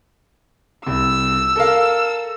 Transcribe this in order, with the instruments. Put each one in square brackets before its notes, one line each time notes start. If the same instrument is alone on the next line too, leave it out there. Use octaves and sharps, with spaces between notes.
[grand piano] C2 [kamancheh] E6
[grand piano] A4 A#4 F5